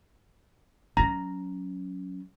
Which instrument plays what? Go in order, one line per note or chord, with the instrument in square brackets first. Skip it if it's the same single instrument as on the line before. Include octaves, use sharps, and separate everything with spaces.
[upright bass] F#3 C#4 [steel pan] A#5